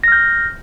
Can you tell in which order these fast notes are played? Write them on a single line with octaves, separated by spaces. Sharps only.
A#6 F6 G6